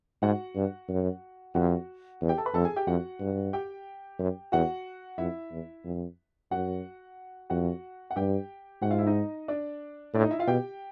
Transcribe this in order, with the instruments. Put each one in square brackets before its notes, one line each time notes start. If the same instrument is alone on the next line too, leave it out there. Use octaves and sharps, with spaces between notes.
[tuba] G#2 [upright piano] F#4 F#5
[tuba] G2
F#2
[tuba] F2 [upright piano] F#4 F#5
[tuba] E2
[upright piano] G4 G5
A4 A5
B4 B5
[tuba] F2 [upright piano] A4 A5
[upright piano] G#4 G#5
G4 G5
[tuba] F2 [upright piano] F#4 F#5
[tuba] G2
[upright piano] G4 G5
[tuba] F#2
[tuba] E2 [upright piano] F#4 F#5
[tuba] F2 [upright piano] E4 E5
[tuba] E2
F2
[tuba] F#2 [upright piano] F#4 F#5
[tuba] F2 [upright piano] F#4 F#5
[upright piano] F#5
[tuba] G2 [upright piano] G4 G5
[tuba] G#2 [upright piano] F#4 F#5
[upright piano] F4 F5
E4 E5
D#4 D#5
D4 D5
[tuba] A2 [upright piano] D4 D5
[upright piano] D#4 D#5
E4 E5
F4 F5
[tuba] B2 [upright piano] G4 G5